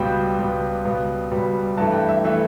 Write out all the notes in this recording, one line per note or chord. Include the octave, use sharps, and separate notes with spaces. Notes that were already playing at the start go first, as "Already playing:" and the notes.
Already playing: C#2 B2 G3 B3 G5
C#2 B2 G3 B3
C#2 B2 G3 B3
C#2 B2 G3 B3
G2 E3 A3 A5
G5
E5
E3 A3 E5